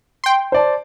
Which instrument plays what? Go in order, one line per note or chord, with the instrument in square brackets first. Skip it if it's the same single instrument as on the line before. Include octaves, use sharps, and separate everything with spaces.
[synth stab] G5 C6
[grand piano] C5 D5 A5